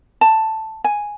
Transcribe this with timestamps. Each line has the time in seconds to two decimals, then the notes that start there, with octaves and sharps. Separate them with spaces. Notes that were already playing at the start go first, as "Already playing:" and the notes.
0.21 A5
0.84 G#5